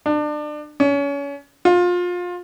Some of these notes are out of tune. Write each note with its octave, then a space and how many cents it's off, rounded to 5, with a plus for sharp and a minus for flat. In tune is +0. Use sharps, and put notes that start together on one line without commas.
D4 +30
C#4 +30
F4 +25